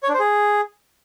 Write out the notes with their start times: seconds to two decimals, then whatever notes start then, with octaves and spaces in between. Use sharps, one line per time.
0.03 C#5
0.08 D4
0.14 C5
0.19 G#4